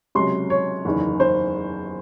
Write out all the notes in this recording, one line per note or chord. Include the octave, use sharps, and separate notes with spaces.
C#2 C3 F#3 C6
C#5
F#1 E2 D#3
C5